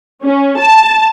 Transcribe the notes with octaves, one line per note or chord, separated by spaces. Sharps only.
C#4
A5